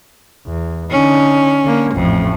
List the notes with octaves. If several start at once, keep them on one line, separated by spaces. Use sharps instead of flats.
E2
D3 C#4 D#4
D3 A#3
A1 F2 A2